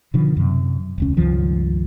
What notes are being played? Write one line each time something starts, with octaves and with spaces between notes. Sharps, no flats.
B2 D3 D#3 F3
F#2 C3
E1 C#2 C#4
C#2 G2 D#3 F3